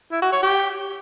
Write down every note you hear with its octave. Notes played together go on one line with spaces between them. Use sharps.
E4
F#4
C#5
G4